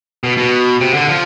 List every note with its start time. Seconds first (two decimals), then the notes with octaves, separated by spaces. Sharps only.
0.24 B2
0.38 B2
0.81 C3
0.94 D3
1.08 F3